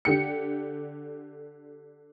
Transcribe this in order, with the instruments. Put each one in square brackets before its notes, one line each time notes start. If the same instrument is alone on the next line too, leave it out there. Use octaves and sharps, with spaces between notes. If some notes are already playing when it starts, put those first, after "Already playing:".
[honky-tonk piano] D3 G4 C#7